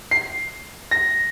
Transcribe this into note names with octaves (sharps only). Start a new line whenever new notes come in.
C7
A#6